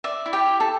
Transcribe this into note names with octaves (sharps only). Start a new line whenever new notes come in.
D5 E5
E4
G4 G5
E4
A4 A5